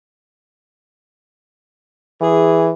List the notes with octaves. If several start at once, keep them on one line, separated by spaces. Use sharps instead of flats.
E3 G#4